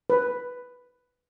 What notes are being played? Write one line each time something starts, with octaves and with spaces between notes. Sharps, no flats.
B4